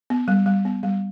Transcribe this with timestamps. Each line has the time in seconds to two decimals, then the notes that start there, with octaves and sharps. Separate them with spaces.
0.10 B3
0.28 G3
0.46 G3
0.65 B3
0.83 G3